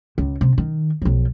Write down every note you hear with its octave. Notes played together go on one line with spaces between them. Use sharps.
C#2
C3
D#3
B1 F3